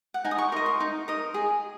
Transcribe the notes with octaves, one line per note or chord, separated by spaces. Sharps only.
F#5
D#4 G#5
D#6
C#6
A#4 D#5 C6
C6
D#4
A#4 D#5
G#4